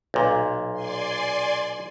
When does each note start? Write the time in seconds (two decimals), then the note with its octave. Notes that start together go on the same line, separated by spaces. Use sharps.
0.14 B1 A#2
0.73 D5 G#5 C6